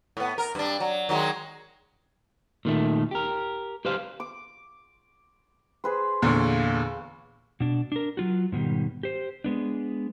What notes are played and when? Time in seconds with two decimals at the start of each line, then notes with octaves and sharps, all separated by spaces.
0.17 A2 B3
0.38 A#4
0.55 G2 D4
0.80 F#3
1.09 D#3 F#3 G#3
2.65 A#2 D#3 A3
3.11 G4 A#4
3.85 G4 B4 C5 F5
4.20 D6
5.84 G#4 B4 C5
6.22 E2 A#2 D3 C#5 F5
7.60 B2 D4
7.92 D4 A#4
8.17 F#3 F4 F#4
8.52 G#2 B2 D#3 G3
9.03 G4 C5
9.44 G#3 B3 D4